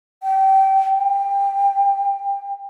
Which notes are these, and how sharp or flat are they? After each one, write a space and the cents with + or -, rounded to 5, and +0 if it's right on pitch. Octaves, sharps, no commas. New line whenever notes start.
G5 -25
G5 +20